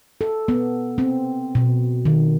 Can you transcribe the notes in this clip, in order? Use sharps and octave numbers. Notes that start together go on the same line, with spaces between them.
A4
B3
C4
B2
D#3